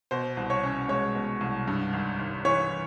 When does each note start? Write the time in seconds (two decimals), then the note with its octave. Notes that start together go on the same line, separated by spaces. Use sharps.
0.11 B2 C5
0.37 C2
0.50 C#5
0.64 C#4
0.89 G#3 C#5
1.15 B2
1.41 C2
1.68 G2
1.93 G#1
2.19 G#1
2.45 E3 C#5